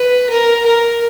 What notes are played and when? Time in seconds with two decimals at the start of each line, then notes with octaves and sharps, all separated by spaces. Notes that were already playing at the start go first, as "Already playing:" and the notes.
Already playing: B4
0.29 A#4
0.66 A#4